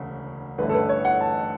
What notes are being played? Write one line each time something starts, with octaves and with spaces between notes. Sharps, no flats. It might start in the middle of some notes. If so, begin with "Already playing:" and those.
Already playing: E1 D2 C#3
A1 G2 D3 A3 C#4 B4
A4
B4
C#5
F#5
A5